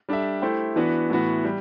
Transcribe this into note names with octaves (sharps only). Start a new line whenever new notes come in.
G3 D4 A4 E5
A3 E4 G4 C5
E3 B3 D4 F#4 B4
A2 E3 B3 F#4
G3